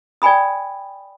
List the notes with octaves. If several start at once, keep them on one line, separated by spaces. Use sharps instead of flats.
D5 G5 G#5 B5 D#6